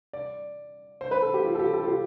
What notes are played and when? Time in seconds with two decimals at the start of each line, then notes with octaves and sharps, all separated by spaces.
0.13 D5
1.01 C5
1.11 B4
1.22 A4
1.34 G4
1.44 F4
1.55 A4
1.59 G4
1.73 A4
1.84 F4
1.88 G4